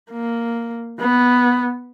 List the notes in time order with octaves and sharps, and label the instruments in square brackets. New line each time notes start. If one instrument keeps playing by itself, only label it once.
[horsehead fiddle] A#3
B3